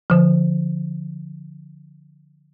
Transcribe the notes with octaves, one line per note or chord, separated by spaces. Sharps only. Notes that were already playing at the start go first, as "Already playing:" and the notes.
D3 F3